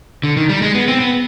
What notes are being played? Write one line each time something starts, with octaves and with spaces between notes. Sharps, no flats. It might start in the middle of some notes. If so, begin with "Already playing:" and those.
D3
D#3
G3
G#3
B3
C4
B3